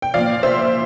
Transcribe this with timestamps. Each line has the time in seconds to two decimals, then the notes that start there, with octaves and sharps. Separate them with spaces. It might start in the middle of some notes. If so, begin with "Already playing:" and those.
0.02 G5
0.14 A#2 F3 D5 F5
0.43 C5 E5